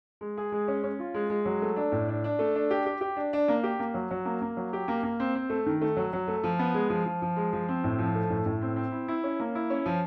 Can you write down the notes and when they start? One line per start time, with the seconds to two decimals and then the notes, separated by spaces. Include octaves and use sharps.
0.21 G#3
0.37 G#4
0.52 G#3
0.68 C#4
0.84 C#4
0.99 F4
1.14 G#3
1.30 G#3
1.45 F#3
1.62 A3
1.76 D4
1.92 A2
2.09 D4
2.24 D4
2.39 A3
2.55 D4
2.71 G4
2.86 G4
3.01 G4
3.16 D4
3.33 D4
3.48 A#3
3.63 G4
3.79 A#3
3.94 F#3
4.11 F#3
4.25 A#3
4.42 A#3
4.57 F#3
4.73 G4
4.88 A#3
5.03 A#3
5.20 C4
5.35 C4
5.50 A3
5.66 D#3
5.81 A3
5.97 F#3
6.13 F#3
6.28 A3
6.43 F3
6.59 B3
6.74 G#3
6.90 F3
7.06 F3
7.22 F3
7.36 G#3
7.53 F3
7.69 C4
7.84 A2
7.99 F3
8.15 A3
8.30 A2
8.46 A2
8.62 C4
8.76 C4
8.92 E4
9.08 E4
9.24 C#4
9.40 A#3
9.55 E4
9.70 C#4
9.86 F3